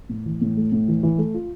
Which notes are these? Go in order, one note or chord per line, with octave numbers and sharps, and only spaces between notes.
A2
E3
A2
A3
A2
E3
E3
A3
F4